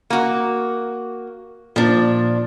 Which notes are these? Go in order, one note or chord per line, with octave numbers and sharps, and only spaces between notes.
A#3 F#4
A#2 F3 D4